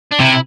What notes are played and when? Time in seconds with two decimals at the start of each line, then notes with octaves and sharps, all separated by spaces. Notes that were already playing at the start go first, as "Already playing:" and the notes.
0.12 D4
0.20 C3 E4